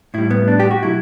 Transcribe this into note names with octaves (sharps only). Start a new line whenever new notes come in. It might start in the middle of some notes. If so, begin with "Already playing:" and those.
A2 G3 E4
B3
D4
G4
F#4
B2 F#3 E4